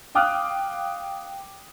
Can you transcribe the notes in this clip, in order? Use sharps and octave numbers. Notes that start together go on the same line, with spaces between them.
F5 G5 D6 D#6 F6 F#6